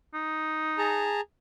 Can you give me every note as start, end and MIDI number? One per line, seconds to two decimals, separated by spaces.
0.14 1.12 63
0.78 1.21 68
0.78 1.21 81
0.78 1.21 82